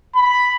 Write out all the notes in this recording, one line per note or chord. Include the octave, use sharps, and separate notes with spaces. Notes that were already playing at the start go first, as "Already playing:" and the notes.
B5